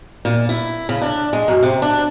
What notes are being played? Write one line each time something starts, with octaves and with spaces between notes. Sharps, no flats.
A#2
E4
C#3
D4
G#3
F#2
C3
D4